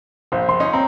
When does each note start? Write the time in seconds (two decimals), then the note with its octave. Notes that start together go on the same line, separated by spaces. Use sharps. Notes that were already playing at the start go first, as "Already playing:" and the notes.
0.32 A#1 C5 F5
0.49 C6
0.60 C#4 D#4
0.73 C4 A#5